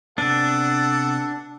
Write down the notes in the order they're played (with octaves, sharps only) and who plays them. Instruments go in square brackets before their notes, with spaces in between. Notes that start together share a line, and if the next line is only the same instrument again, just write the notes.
[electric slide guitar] C3 B3 [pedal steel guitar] D4 [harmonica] A4 F#5